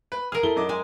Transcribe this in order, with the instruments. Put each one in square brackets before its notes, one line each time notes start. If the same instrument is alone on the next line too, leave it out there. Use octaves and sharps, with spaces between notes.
[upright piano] B4
[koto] G#4 A#4 [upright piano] F6
[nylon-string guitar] E4 A4 [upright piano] G7
[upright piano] F#2 D#5 D6
[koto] G#3 G#5 [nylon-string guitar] G5